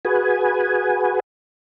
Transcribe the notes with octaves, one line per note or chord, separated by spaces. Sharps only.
F#4 G#4 B4 G#5